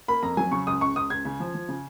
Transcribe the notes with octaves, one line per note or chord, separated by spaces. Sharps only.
A#3 B5
F2 A#5
F#3 G#5
C#3 C#6
C#2 D#6
C#2 C#6
C#2 D#6
C#2 G#6
C#3
F3
F3
C#3